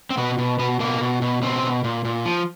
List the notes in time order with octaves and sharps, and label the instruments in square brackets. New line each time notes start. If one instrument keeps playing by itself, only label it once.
[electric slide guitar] C4
B2 B3
B2
B2 B3
B2 A#3
B2
B2
B2 C4
B2
A#2
A#2
F3